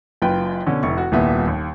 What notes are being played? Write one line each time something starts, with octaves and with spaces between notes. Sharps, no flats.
F#1 F#2 F4 B4 G5
B2 D3 C#4
F1 E4 C#6
F#4
D#1 C2 A#2 B3 E5
D#2